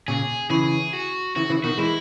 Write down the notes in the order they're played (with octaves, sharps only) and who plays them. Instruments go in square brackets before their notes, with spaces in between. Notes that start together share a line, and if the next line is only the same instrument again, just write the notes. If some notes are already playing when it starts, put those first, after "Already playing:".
[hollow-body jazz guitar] A#2 C#3 [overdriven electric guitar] G#4
[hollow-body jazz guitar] C#3 E3 [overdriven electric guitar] G#4
[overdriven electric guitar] F#4
[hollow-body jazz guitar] C#3 E3 [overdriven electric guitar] F#4
[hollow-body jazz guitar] C#3 E3
[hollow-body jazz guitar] B2 D#3 [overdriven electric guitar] F#4
[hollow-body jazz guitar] E3 G#3 [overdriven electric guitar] E4